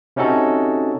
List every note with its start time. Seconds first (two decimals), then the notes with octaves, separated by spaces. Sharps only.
0.16 C3 C#4 D#4 F#4 A4